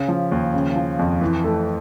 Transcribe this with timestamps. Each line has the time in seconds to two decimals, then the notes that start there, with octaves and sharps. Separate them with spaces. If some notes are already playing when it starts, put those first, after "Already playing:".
Already playing: C#3
0.08 F3
0.32 D#2
0.54 C#3
0.76 F3
0.99 F2
1.21 E3
1.44 A3